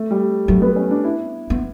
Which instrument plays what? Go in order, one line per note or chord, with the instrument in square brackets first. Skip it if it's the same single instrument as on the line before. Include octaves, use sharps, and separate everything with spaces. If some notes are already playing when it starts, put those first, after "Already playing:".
Already playing: [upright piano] A3
G3
[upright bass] F#3 [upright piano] A3
[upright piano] B3
C#4
D4
E4
[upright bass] B3